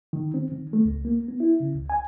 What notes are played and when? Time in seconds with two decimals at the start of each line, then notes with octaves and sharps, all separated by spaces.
0.13 D#3
0.34 C4
0.52 D#3
0.73 A3
0.85 C#2
1.05 A#3
1.28 B3
1.40 E4
1.60 C#3
1.74 C#2
1.90 G#5